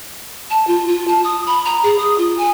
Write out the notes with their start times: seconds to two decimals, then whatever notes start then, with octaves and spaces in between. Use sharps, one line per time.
0.50 A5
0.67 F4
0.88 F4
1.08 A5
1.24 D#6
1.47 B5
1.65 A#5
1.83 G#4
1.99 D#6
2.18 F4
2.37 G#5